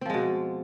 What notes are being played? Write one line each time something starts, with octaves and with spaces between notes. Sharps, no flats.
B2 F3 G#3 C4